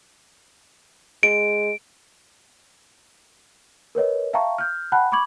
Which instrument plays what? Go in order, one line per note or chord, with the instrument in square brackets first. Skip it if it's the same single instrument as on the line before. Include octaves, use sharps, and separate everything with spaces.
[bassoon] G#3 [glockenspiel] D7
[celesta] A#4 B4 C#5 D#5
E5 F5 G5 A5 A#5 C#6
F6 G6
F#5 G5 A5 B5 F#6
B5 C#6 D6 G#6 F#7